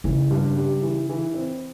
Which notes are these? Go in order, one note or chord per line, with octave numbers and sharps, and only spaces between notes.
C#3 E3
G2
G3
E3
E3
C4